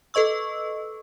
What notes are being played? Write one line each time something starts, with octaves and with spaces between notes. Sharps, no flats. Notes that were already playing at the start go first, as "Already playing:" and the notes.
A4 B4 D#5 C#6 E6